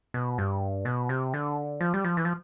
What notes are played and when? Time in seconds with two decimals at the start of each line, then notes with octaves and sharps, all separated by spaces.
0.14 B2
0.38 G2
0.85 B2
1.09 C3
1.34 D3
1.81 F3
1.94 G3
2.04 F3
2.17 E3
2.25 F3